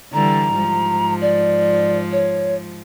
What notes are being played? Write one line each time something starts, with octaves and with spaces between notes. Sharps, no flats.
D3 E3 G3 A#5
G#2 F3
D5
C#5